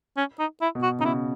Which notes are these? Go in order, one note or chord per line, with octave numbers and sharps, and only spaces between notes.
C#4
D#4
E4
B2
F#4
C#3 D#4
B2 E4